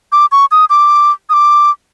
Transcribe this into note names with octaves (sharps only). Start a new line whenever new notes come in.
D6
C#6
D#6
D6
D#6
D6